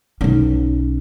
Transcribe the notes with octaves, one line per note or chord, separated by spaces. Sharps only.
B1 C#4